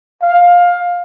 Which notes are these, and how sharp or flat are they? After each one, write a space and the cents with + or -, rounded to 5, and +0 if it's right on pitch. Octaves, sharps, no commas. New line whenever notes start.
F5 +15